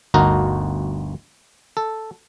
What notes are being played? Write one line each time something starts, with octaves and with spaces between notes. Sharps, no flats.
G1 D2 D#4 F#4 A#4
A4